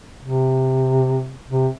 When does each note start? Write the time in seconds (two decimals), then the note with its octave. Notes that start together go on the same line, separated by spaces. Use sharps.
0.22 C3
1.49 C3